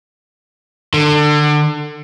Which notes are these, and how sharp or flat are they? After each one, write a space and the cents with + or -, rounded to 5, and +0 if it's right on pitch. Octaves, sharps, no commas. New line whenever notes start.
D3 +25